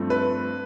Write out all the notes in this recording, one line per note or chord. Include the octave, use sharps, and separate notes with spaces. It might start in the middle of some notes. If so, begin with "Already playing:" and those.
Already playing: G2 F3 A3 C4
B4